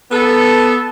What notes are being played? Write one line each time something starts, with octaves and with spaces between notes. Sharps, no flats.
B3 A4